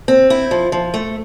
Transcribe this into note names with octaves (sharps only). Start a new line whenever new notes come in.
C4
E4
F3
F3
A3